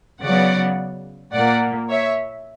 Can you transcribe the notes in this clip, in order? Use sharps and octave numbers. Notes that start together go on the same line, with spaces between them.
C#3 F#3 B3 D5 F#5
A#2 A#3 D5 F#5
C#5 E5